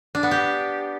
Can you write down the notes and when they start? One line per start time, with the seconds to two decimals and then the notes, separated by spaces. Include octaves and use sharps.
0.15 D4
0.23 B3
0.31 G4